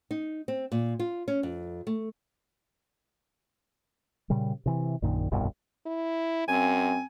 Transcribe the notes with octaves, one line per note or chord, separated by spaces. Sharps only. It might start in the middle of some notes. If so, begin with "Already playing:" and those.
D#4
C4
A#2
F4
C#4
F2
A3
A#2 C#3 G3
C3 E3
A#1 F#2 A#2 D#3
F1 C2 G2 B2
E4
F#2 C4 G#5